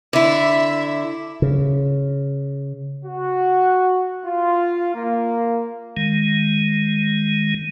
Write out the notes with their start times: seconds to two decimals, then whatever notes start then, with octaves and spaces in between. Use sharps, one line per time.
0.13 D3 E4 E5
1.42 C#3
3.05 F#4
4.24 F4
4.94 A#3
5.97 D#3 G#3